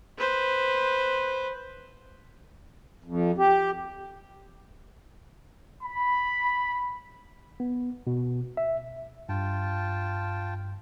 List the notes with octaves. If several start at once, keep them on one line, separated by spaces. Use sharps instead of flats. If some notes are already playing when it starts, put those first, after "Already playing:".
B4 C5
F2
G4
B5
B3
B2
E5
G2 F4 G5 A5